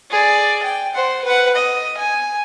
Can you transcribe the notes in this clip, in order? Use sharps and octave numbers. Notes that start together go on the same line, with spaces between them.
G#4 D5
G5
C5 F#5
B4 F#5
D#5
G#5